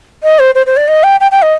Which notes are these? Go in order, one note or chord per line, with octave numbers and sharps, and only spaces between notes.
D#5
C5
C5
C5
D5
D#5
G5
G5
G5
D#5